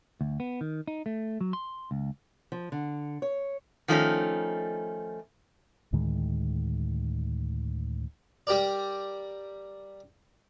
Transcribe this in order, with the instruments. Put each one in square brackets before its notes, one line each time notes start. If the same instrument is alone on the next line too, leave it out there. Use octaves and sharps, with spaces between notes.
[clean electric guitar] D2
B3
D#3
D#4
A3
F#3
C6
C#2
[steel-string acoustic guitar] F3
D3
C#5
[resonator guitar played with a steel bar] D#3 F3 A3 C#4 D#4
[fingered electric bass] D2 A2 D#3 G#3
[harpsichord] G3 G4 A#4 D5